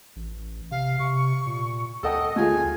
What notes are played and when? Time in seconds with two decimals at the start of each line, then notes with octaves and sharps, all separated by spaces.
0.16 A1
0.71 C3 F5
0.99 C3 C#6
1.46 A#2
2.03 D2 A4 D#5 F#5 G5
2.36 A3 F4 G#4 G#5